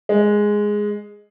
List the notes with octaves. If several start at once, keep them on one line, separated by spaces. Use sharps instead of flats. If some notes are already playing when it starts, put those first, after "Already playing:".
G#3